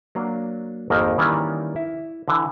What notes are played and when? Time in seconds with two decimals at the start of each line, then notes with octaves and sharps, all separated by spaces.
0.15 F#3 A#3 D4
0.90 G#1 F2 D#3 A#3 D#4 A#4
1.18 D#3 E3 G3 A#3 C#4 D5
1.76 E4
2.28 D3 E3